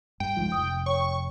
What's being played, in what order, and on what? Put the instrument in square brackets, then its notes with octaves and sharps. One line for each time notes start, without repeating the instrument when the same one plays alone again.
[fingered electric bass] G2 [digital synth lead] G5
[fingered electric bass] C#2 G#2 F3
[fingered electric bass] F1 [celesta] D#6
[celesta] C#5 G5 [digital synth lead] C#6